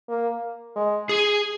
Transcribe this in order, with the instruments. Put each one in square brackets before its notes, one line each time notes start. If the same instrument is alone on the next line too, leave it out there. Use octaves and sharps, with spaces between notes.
[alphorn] A#3
G#3
[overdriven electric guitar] G#4